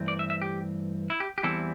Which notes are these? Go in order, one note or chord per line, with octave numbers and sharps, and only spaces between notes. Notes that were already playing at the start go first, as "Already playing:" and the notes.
Already playing: G2 E3 A3 C4
D5
E5
E5
G4
E4
G4
G4
E2 E3 G3 C4 E4 A4